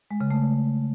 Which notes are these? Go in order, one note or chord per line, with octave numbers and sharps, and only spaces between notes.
G#3
C#3
A3